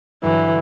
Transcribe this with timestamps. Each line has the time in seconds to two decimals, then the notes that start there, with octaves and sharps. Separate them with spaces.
0.24 G2 D3 E3 F#3